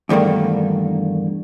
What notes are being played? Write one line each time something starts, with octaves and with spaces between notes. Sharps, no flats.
E2 G2 D#3 A3 A#3